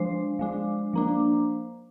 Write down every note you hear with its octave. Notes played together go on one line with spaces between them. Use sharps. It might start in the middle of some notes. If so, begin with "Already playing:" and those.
Already playing: F3 G#3 D4 C5
F3 G#3 D4
F3 A#3 D4